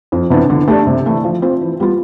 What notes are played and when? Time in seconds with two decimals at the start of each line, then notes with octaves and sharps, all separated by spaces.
0.12 F2
0.30 C3 E3 B3 D4
0.50 D3
0.68 A3 D4 G4 D5
0.87 C3
1.05 E3 A3 E4
1.24 F3
1.42 C4 F4
1.61 E3
1.80 G3 B3 F4